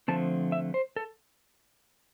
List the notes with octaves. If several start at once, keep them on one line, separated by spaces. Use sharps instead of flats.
D3 F3 A3 C4 A5
E5
C5
A4